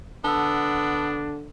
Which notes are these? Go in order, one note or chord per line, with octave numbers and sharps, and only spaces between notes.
D3 B3 D4 A5 E6